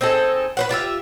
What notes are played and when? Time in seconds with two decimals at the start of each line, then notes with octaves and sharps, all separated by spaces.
0.01 C4 D#4 G#4 A4
0.57 B4 C5 F#5
0.69 D4 F4 G4 E5